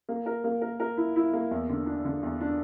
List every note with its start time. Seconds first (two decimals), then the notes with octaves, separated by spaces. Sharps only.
0.09 A#3
0.26 A#4
0.44 A#3
0.61 A#4
0.80 A#4
0.97 E4
1.16 E4
1.33 A#3
1.51 E2
1.69 D3
1.86 D4
2.05 D3
2.23 E2
2.41 D4